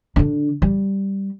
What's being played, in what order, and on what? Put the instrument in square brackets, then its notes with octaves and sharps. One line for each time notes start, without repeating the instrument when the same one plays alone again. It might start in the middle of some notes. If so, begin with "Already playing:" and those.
[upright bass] D3 D4
G3